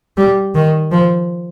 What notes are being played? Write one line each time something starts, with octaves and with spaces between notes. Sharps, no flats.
G3
D#3
F3